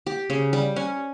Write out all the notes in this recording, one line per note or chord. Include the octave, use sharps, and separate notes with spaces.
G4
C#3
G3
C#4